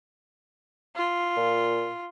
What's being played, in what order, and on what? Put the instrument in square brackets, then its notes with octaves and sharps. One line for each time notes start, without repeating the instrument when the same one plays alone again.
[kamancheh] F4
[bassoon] A#2